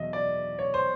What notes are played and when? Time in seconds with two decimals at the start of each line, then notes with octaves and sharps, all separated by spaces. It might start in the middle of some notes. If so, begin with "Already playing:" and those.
Already playing: E2 B2 F#3 D#5 E5
0.13 D5
0.59 C#5
0.74 C5